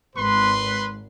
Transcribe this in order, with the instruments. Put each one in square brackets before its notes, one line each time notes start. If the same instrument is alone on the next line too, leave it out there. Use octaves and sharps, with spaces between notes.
[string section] G#1 [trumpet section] B4 C6